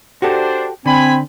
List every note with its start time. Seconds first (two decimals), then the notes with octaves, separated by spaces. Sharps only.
0.22 D4 F#4 G4 A4 C5
0.86 D3 C4 G#5 B5